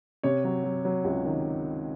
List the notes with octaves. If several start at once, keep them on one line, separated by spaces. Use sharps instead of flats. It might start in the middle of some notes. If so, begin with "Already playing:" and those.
C3 C#5
F#3
F#3
F#3
C#2
D#3